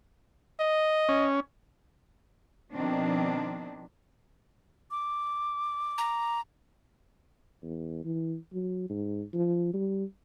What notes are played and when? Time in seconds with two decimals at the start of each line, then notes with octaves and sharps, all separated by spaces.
0.60 D#5
1.09 C#4
2.75 B2 D#3 F3 C4 D4
4.91 D6
5.98 A#5
7.62 E2
8.04 E3
8.53 F#3
8.90 G#2
9.34 F3
9.73 G3